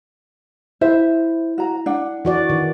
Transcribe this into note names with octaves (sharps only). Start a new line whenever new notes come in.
E4 C5 E5
F#4 A#5
D4 F#5
E3 F#4 D5
D#3